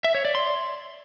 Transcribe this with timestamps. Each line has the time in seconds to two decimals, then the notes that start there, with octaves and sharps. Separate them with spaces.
0.04 E5
0.15 C#5
0.25 D5
0.35 C6